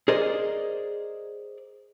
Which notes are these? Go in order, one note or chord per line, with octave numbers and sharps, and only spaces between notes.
G#4 A#4 C5 D5 D#5